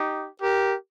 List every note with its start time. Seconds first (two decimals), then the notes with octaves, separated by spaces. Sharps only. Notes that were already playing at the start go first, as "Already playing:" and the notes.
Already playing: D#4 G4
0.42 G4 A#4